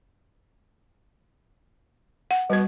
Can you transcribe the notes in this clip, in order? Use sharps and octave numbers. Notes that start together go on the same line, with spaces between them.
F#5
B2 G3 B4